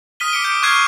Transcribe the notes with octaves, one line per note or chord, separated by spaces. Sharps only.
D#6 F6 B6 D#7 G7
D6 C#7 D7
G6
C#6 F6 F#6 G#6 C7 D#7